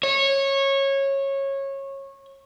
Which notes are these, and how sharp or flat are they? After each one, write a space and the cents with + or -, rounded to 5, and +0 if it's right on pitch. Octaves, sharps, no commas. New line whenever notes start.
C#5 -20